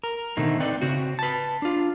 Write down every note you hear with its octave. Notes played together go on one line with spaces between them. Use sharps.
A#4
B2 D3 D#3 A3 C4 D#4
A3 C4 D#4 B4 D5
C#3 C4 F#4
B4 A5
D4 F4